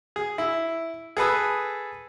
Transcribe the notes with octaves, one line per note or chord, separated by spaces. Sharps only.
G#4
E4
G#4 A4 B4 D#6